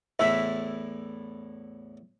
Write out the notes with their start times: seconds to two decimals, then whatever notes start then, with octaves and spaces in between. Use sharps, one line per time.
0.19 E2 A2 E4 E5